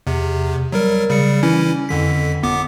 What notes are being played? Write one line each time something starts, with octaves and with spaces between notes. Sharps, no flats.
E2 C3
F#3 G3 A#4
C#3 G3 C#7
E3 C#4 E4
F2 D3 B6
G1 B3 D6